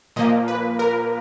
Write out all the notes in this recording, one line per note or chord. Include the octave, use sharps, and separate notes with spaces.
A#2 F3 A#3 D#5
B4
A#4